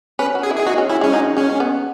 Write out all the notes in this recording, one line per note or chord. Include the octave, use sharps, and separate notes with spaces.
C#4 B4
F#4
G#4
E4
G#4
D#4 F#4
C#4
C#4 E4
G#3 C#4
F#3 D#4
G#3 C#4
B3